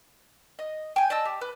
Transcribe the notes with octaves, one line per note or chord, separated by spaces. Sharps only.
D#5
G5 G#5
D5 D#5 A5 E6
G4
B4